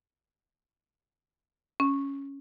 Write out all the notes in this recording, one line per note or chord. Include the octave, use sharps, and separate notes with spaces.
C#4